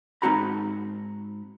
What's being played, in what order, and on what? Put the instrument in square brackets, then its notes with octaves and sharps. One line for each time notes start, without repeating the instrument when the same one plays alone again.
[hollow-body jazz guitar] G#2 C4 D#4 F#4 A#5 B5